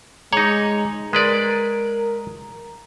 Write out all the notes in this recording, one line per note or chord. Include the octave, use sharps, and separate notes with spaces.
G#3 D#4 C#5 A#5
G#3 A#4 B4 D5